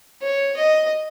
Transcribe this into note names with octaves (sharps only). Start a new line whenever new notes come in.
C#5
D#5